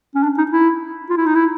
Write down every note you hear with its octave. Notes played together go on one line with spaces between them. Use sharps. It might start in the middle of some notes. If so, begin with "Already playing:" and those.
C#4
D4
D#4
E4
F4
E4
D#4
E4